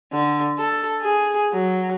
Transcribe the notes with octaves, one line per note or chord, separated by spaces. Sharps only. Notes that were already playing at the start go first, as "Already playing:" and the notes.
D3
A4
G#4
F#3